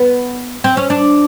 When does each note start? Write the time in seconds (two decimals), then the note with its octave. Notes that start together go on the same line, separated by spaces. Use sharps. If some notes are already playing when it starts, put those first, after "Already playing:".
Already playing: B3
0.64 C4
0.77 C#4
0.90 D4